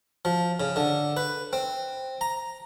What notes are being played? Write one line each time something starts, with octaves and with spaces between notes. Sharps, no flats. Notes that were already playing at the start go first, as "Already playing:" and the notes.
F3
C#3
D3
B4
C4
A#5